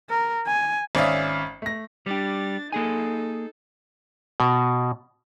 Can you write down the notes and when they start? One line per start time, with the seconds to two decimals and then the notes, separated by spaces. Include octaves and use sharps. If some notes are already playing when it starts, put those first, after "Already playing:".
0.10 A#4
0.47 G#5
0.95 G#1 C#4 D5 E5 F5 D#6
1.62 A3 A#6
2.06 G3 D4 G4 A6
2.73 A#3 D#4 G#4 A4 G#5
4.40 B2